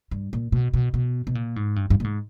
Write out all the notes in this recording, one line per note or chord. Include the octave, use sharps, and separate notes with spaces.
G2
A#2
B2
B2
B2
B2
A#2
G#2
G2
G2
A#2
G#2